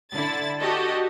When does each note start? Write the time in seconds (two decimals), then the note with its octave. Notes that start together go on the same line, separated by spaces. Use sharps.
0.14 D3 E4 A6
0.61 F#4 G4 A4 D#5